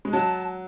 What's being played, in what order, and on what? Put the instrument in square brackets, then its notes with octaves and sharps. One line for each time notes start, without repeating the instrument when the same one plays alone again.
[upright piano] G#3
[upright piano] F#3 [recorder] A5